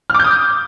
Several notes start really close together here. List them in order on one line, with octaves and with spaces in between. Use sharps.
F6 D6 G6 D#6